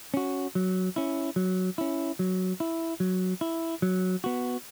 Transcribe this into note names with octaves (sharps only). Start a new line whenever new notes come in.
C#4 F#4
F#3
C#4 E4
F#3
C#4 E4
F#3
E4
F#3
E4
F#3
B3 F#4